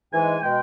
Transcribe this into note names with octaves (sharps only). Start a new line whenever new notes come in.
G#2 E3 G#3 G#5
B2 G#3 G5